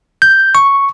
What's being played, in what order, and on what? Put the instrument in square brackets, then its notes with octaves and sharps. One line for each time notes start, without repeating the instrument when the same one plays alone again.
[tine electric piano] G6
C#6